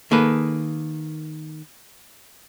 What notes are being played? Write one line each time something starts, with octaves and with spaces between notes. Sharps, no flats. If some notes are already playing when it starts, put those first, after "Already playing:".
D#3 A#3 G#4 A4 B4